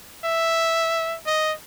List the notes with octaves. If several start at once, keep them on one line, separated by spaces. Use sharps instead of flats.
E5
D#5